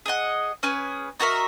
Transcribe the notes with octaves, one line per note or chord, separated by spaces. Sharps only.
G#4 D#5 F#5
C#4 G#4 B4
D#4 F#4 A#4 E5